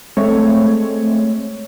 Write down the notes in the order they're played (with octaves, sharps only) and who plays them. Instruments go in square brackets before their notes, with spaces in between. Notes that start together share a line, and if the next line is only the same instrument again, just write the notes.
[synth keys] G#3 A3 C4 C#5